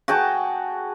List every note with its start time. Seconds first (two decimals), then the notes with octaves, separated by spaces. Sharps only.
0.08 F#4 G#4 G5 A5